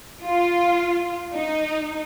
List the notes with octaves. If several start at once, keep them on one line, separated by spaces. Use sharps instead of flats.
F4
D#4